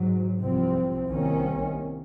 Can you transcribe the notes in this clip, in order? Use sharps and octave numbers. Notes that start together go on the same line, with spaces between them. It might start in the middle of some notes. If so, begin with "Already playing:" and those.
Already playing: G#2 F#3
C2 C3 F3 C4
C2 C3 D#3 A#3 C#4